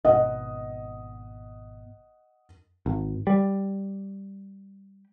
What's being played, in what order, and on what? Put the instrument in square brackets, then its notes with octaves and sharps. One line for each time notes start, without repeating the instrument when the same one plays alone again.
[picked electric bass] G#1 B2 [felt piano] D#5 F#5
[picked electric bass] G#1
G3